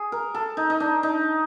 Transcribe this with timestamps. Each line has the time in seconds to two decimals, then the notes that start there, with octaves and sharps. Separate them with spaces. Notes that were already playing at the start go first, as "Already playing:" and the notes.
Already playing: G#4
0.12 A#4
0.34 A4
0.57 D#4
0.70 D#4
0.80 D4
1.03 D#4